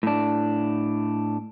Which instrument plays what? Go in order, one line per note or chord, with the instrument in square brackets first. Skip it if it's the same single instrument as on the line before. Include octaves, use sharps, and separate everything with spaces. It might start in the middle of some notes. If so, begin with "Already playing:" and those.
[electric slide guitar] A2 D4